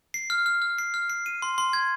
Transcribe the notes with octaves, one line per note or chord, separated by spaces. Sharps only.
C7
F6
F6
F6
C7
F6
C7
D#7
C6
C6
G#6